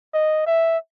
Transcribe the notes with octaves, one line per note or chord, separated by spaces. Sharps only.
D#5
E5